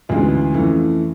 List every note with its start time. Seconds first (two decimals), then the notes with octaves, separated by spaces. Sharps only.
0.09 D2 C#3 E3 G#3 B3 F4
0.54 F2 C#3 E3 A3